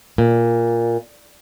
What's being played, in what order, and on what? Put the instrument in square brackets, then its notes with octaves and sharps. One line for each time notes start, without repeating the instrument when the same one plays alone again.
[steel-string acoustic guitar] A#2